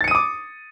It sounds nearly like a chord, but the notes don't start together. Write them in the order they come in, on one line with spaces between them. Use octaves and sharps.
A6 C#7 D#7 D#6 D6